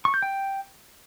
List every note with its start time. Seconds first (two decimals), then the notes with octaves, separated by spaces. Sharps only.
0.05 C#6
0.14 G6
0.22 G5